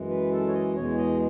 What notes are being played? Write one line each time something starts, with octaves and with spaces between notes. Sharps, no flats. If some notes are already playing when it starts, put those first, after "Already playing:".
Already playing: F#2 E3 G#3
B4
A4
C#5
D#5
E2 B2 G#3 C#5
D#5